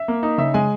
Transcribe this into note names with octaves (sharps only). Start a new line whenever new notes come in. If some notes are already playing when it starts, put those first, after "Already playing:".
Already playing: E5
A#3
D#4
C#3 E5
G#3 G#5